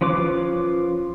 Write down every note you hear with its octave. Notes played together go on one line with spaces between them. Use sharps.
F3 C#4 F4 B4 D6